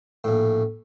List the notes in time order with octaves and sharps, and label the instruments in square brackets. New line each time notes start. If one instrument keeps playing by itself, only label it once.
[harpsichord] A#1 A2